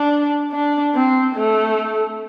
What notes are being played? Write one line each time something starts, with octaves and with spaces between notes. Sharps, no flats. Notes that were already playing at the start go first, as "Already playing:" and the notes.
Already playing: D4
D4
C4
A3